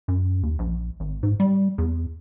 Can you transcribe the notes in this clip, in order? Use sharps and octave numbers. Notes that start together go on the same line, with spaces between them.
F#2
D#2
A#1
G#1
G#2
G3
E2